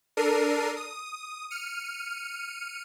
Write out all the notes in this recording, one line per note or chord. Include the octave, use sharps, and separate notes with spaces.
D4 A4 A#4 C7 D#7
D#6
F6 C#7 D#7